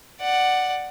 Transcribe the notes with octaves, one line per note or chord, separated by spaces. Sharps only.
D5 F#5